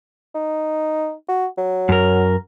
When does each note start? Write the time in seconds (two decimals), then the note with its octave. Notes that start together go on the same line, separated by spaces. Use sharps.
0.35 D#4
1.29 F#4
1.58 F#3
1.89 F#2 A#4